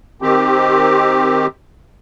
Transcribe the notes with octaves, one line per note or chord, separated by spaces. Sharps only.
D#3 C4 G4